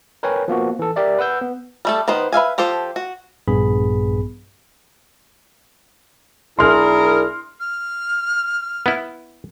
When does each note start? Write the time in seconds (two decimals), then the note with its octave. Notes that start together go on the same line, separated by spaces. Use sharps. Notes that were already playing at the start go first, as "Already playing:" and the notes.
0.23 A#4 B4 C#5 G5 G#5
0.48 F3 A#3 B3 F#4
0.79 E3 A4
0.96 G4 A#4 D5 E5
1.19 B4 F#5 E6 G6
1.41 B3
1.85 G3 A3 A4
2.08 D#3 B3 B4 C5
2.32 B4 E5 F5 G#5
2.58 F3 G4 A4 C5
2.96 F#4
3.48 A#1 G2 B3 G#4 B5
6.59 B1 D4 E4 G#4 A#4 C6 F6
7.60 F6
8.86 B3 E4